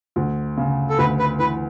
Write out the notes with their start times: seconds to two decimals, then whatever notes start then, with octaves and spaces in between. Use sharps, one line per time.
0.16 D2
0.57 C#3
0.89 A4
0.98 D2 B4
1.19 B4
1.39 E3 B4